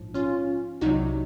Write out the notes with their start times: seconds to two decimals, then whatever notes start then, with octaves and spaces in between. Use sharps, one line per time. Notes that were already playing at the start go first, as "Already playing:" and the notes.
Already playing: A#1 G#2 F3
0.14 C#4 F4
0.81 C2 C3 F#3 D#4 F#4